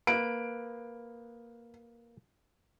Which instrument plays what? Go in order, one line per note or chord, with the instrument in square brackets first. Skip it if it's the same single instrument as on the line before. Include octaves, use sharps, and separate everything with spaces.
[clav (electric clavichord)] A#3 B4 [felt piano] D7